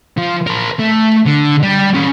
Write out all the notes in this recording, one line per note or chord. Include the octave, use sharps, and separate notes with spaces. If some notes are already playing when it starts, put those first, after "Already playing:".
F3
A#4 C5
A3
D3
G3
C#4 A4